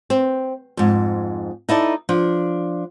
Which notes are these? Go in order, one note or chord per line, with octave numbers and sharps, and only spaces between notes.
C4
F2 G#2
D#4 E4 A4 D5
F3 D4